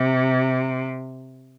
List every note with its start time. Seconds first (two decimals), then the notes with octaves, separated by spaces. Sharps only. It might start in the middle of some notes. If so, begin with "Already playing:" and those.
Already playing: C3